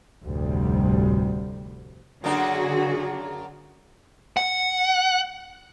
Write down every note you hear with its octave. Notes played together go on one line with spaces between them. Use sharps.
F1 D2 A2 C3 G3
F#2 D3 A#3 D4 F#4 G#4
F#5